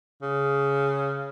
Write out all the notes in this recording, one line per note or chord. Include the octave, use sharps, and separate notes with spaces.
C#3